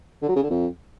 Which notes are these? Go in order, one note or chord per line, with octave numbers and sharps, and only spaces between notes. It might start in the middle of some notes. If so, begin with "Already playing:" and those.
D3
F#3
C#3
D3
F2